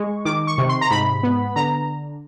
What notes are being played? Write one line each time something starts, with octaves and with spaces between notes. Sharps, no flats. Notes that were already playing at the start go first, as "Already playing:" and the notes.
Already playing: G#3 C#6
D#3 D6
C#6
C3
C6
A#5
G#2 B5
B3
D3 A#5